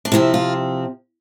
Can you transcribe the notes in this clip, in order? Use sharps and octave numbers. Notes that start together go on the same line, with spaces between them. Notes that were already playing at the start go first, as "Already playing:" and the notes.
D4
C3 F3 C4 E4
F4